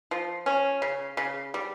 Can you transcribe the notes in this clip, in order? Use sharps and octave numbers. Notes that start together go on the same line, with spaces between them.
F3
C#4
C#3
C#3
G3